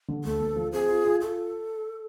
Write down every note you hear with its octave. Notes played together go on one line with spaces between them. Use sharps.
D3
D2 A4
D2
F3
C4 G#4
F4
F4
F4 A4